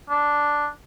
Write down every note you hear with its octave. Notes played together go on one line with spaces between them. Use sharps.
D4